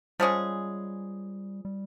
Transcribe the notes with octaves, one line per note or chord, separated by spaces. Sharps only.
F3 G3 G#3 C#4 G#4
G3